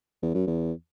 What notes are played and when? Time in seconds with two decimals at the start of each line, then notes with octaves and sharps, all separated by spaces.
0.23 E2
0.35 F#2
0.47 E2